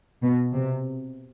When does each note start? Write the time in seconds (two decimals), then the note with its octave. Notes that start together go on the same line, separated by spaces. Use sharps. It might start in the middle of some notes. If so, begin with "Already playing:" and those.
0.23 B2
0.56 C3